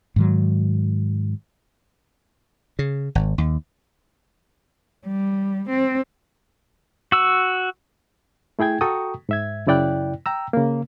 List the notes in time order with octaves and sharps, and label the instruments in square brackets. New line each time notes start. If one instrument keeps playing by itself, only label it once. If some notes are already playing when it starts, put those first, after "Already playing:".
[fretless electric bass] G#2 D#3 F#3
[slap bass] C#3
G#1
D#2
[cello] G3
C4
[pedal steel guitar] F#4 E6
[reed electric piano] A3 E4 G#4 G5 G#6
F#4 A4 G5 A#5 C#6 D#6
G#2 E5 G#6
F#2 C#3 E4 D5 G5 F#6
G5 A#5 E6
C#3 A#3